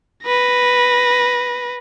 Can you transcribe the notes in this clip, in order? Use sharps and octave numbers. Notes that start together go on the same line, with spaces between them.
B4 A#6